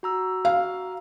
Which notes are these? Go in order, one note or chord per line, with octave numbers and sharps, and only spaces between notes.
F#4 A#5 E6
F5